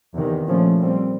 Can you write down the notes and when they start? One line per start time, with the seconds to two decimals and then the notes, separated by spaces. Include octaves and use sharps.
0.14 E2 C3 D#3
0.46 A#2 F3 A3 C#4
0.78 A#2 G3 C4